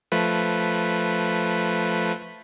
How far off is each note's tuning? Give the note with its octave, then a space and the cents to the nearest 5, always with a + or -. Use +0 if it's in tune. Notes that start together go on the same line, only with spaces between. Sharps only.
F3 +0 A3 +0 B4 +0